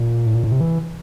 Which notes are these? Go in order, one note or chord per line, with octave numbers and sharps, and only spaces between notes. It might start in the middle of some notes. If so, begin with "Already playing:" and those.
Already playing: A#2
A2
A#2
A2
C3
E3